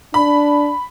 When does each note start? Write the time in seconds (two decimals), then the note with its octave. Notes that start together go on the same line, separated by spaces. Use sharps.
0.14 D4 B5